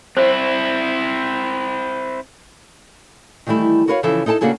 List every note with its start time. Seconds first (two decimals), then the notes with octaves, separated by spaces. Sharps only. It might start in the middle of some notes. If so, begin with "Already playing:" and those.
0.17 C4 E4 C5
3.47 D#3 E3 G3 A3 E4
3.88 F#4 A#4 B4 C#5 F5
4.03 C#3 E3 F3 A4 E5
4.26 D#4 E4 A4 G5 A5
4.41 C#3 A#3 D4 F#4 G#4 A4